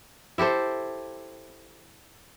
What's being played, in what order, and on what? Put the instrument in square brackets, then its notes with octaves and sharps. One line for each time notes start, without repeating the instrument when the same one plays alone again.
[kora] E4 G4 A4 C5